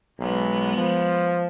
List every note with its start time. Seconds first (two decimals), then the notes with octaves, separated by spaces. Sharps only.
0.20 B1 G#3 B3
0.77 F3